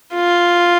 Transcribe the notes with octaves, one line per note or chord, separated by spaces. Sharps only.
F4